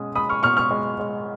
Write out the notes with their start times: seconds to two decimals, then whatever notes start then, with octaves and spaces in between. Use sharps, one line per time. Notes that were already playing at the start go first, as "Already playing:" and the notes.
Already playing: B2 G#3 C#4 D#6
0.15 G#3 B5 D#6
0.29 C#6 F6
0.43 B2 C#6 F6
0.57 C#6 F6
0.71 G#3
1.00 G#3